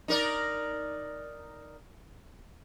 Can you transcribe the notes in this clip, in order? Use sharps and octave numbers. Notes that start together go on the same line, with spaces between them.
D#4 A#4 D5